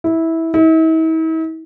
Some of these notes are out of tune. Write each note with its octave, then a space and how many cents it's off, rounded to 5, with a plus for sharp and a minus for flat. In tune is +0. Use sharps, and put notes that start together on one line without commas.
E4 -15
E4 -45